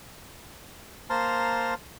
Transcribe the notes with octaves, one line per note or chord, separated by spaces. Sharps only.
A#3 C5 A5 A#5 C6 F6